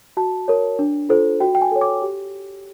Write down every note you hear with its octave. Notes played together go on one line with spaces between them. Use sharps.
F#4 A5
A#4 C#5
D4
F4 A4 C5
F#4 G5
G5
G#5
A4 C#5
D6
G4